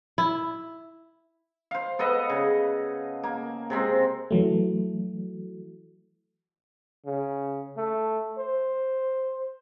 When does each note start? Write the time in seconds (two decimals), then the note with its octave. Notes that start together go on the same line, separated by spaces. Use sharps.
0.18 E4
1.71 C5 F5
1.99 B3 A4 B4 D#5
2.30 C#3
3.24 A#3
3.70 C3 G#3 C4
4.31 E3 F#3 A3
7.06 C#3
7.77 A3
8.38 C5